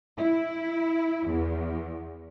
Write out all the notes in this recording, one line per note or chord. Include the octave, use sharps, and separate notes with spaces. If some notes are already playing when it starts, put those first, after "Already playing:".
E4
E2